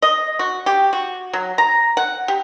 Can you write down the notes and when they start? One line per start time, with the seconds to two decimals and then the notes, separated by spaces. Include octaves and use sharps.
0.02 D#5
0.39 F#4
0.66 G4
0.93 F#4
1.33 F#3
1.58 A#5
1.97 F#5
2.28 G4